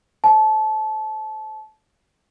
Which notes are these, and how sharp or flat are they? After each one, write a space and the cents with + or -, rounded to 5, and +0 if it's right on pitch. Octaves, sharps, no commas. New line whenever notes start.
C5 +0 A5 -25